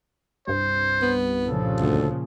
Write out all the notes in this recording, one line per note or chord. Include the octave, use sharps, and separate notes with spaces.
C2 G2 C5
B3
A#2 C#3 F3 A4
D2